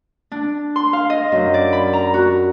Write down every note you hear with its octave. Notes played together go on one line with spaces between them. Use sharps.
D4
C6
F5
D#5
F#2
D5
B5
A#5
F#4